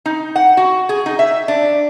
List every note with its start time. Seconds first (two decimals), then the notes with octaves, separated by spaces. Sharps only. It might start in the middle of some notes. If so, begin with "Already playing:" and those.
0.06 D#4
0.36 F#5
0.57 F#4
0.89 G#4
1.06 D#4
1.19 E5
1.48 D4